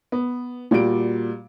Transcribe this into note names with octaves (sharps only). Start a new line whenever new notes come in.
B3
A#2 G3 F#4 D7